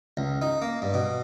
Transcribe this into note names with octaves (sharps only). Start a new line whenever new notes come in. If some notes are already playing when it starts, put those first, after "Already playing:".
C#2
D#4
A#3
G2
B2